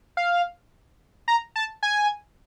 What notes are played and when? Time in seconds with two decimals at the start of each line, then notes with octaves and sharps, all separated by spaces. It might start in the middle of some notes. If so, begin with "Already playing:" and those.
0.17 F5
1.28 A#5
1.56 A5
1.83 G#5